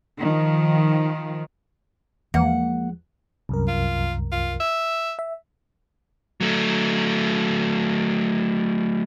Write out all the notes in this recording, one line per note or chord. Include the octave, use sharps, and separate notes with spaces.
D#3 F3
E2 F3 G#3 A#3 F#5
C2 F#2 A#4
F4
F4
E5
E5
F#3 A3